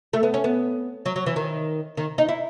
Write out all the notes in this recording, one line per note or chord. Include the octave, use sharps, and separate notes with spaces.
A3
B3
C#4
B3
F#3
F#3
E3
D#3
D#3
D#4
E4